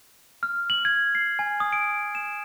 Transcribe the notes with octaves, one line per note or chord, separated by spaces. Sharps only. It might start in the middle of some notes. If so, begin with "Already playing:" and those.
F6
F#7
G#6
C7
G#5
D#6
D7
E7